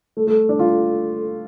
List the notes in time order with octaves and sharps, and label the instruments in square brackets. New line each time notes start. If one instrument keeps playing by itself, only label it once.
[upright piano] A3
A3
D4
F4